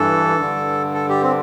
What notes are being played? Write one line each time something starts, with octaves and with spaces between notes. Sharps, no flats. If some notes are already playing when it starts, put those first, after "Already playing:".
Already playing: G2 E3 A4
G2 D3
A4
G4
C4